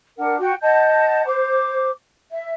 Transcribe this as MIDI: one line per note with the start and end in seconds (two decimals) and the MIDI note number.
0.17 0.36 62
0.17 0.36 70
0.17 0.36 78
0.38 0.53 66
0.38 0.53 79
0.61 1.23 75
0.61 1.23 78
0.61 1.23 81
0.61 1.23 91
1.26 1.90 72
1.26 1.90 86
2.32 2.53 76